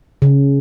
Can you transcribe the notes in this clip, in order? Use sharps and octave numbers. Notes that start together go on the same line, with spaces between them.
C#3